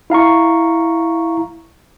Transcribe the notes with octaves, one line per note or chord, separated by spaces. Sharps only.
E4 F5 A#5 C#6